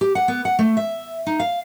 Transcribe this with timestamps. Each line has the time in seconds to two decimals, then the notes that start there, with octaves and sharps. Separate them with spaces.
0.01 G4
0.15 F#5
0.28 B3
0.45 F#5
0.59 A3
0.77 E5
1.27 D#4
1.40 F5